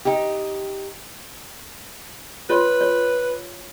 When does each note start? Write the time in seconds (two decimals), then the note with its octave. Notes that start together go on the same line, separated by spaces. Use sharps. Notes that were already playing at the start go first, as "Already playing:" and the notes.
0.05 D#4 G4
2.50 F4 B4 C#5 C6
2.81 C#5